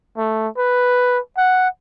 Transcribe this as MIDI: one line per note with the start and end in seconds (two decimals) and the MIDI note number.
0.17 0.48 57
0.58 1.19 71
1.37 1.68 78